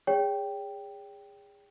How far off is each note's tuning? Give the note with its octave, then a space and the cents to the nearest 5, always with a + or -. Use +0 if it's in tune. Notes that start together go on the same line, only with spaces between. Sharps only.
G#4 -30 C#5 +35 G5 +0